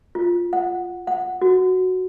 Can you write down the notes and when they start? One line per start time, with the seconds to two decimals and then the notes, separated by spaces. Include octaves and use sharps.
0.15 F4
0.53 F#5
1.07 F#5
1.42 F#4